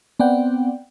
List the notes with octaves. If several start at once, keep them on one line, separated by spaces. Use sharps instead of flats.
B3 C4 D5 F#5 G5